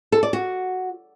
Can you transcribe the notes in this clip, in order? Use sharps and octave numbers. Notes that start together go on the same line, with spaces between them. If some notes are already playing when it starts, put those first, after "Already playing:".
A4
D5
F#4